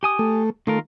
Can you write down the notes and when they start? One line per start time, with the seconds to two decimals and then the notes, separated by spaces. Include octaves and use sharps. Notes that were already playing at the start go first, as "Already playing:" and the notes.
0.03 G4 G#5 D#6
0.19 A3
0.67 D#3 A3 F4 A#4